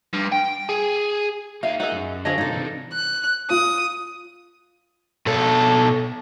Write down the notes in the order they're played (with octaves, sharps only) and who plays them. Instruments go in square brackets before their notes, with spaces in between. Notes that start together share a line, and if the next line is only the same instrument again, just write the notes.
[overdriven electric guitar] G2
G5
G#4
[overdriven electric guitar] A#3 D#4 [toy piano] E5 [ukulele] F5
[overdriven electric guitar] D#4 [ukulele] G#4 F#5 [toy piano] A#4 D#5
[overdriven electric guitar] F#2
[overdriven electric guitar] D3 [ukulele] G#4 C#5 D#5 [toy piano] C5 F5 A5
[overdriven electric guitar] G2 C3 [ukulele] D#4 A4 [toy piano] D5
[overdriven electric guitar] C3 E3
[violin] F#6
[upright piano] F4 [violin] D#6
[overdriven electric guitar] B2 A4